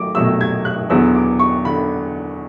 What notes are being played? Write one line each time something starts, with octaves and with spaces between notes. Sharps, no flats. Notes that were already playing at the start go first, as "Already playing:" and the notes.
Already playing: F#3 A3 D6
B2 F#3 A3 E6
G#6
F#6
E2 D3 F#3 B3 E6
D6
C#6
D3 B5